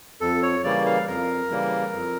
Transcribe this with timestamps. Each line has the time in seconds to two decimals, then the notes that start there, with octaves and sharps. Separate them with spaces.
0.21 F2 A4
0.43 C#5
0.64 C#3 E3 G3 A#3 D5
0.86 F5
1.07 F2 A#4
1.50 C#3 E3 G3 A#3
1.93 F2